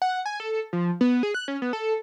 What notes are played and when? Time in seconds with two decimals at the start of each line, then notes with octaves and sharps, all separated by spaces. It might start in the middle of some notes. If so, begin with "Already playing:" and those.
0.02 F#5
0.26 G#5
0.40 A4
0.73 F3
1.01 B3
1.23 G#4
1.34 F#6
1.48 C#4
1.62 B3
1.73 A4